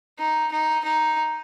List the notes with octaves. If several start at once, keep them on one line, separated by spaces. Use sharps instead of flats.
D#4
D#4
D#4